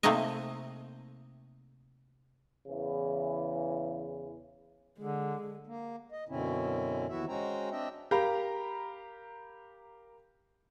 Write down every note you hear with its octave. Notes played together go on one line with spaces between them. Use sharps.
C3 A3 A#3 C4 D#4 D#5
E2 C#3 E3
D3 G#3
A#3
D#5
F#2 B2 D3 C4 C#4 E4
D#2 E3 B3 E4 F#4 E5
G#3 C#4 F#4 C5 G5 A#5
C4 D4 D#5 E5 G5
G4 A#4 F5 A#5 B5